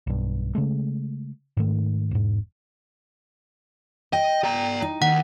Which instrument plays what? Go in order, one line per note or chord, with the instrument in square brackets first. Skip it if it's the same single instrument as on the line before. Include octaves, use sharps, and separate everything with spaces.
[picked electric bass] B1 G2
C#3 G#3 A3
G#2 D#3 A3
E1 G#2
[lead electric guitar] D#5 [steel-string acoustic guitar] G5
[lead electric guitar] D5 A#5
[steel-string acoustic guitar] D#4
[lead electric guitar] D#2 [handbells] F#5